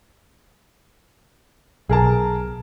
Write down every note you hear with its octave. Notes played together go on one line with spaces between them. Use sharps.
B1 G#4 A#4 A5